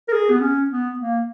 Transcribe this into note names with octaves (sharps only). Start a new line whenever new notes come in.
A#4
G#4
B3
C#4
B3
A#3